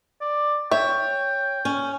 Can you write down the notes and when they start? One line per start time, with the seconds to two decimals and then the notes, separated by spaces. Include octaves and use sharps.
0.21 D5
0.71 C#5 E5 G5
1.65 C#4